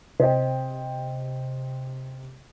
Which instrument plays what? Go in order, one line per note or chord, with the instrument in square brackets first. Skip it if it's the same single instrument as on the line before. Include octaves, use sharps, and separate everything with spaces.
[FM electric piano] C3 [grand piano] C5 D#5 G5